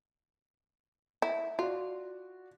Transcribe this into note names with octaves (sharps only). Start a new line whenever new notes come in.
E4
F4 F#4 D5